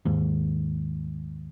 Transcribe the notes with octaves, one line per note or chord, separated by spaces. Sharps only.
D#2 G#2